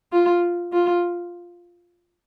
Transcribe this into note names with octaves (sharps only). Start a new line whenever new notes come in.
F4
F4